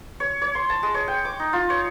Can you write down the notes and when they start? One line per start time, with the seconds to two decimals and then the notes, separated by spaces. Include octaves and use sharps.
0.20 C#5
0.41 C#5
0.55 C6
0.70 A5
0.83 G#3
0.94 C#5
1.08 G5
1.25 D6
1.39 D#4
1.53 F4
1.70 C#5